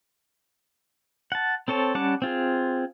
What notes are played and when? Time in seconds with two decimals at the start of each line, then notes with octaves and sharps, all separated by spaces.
1.32 F#5 A5
1.68 C4 A4 C#5 A5
1.95 G3 C#4 F#5 A5 D6
2.22 C4 F4 G#4